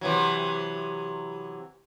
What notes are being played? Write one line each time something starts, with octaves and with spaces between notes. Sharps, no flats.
C3 E3 F#3